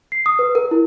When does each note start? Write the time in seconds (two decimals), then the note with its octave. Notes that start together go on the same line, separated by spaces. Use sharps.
0.12 C7
0.26 D#6
0.39 B4
0.55 A#4
0.71 E4